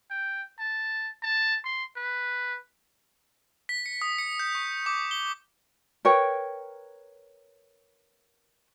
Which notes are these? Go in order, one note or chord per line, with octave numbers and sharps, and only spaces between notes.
G5
A5
A5
C6
B4
B6
C#7
D#6
C#7
G6
C#6
D6
G7
A#4 B4 C#5 G5